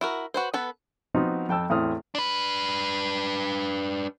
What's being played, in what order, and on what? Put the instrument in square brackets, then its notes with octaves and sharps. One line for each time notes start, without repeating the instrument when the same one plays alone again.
[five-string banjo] E4 F#4 A#4
F#4 B4 C5
B3 A4 B4
[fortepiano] F3 B3 C4 D#4 F#4
F2 G5 A5 E6
E2 A2 C4 D#6 F6
[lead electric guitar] D4 B4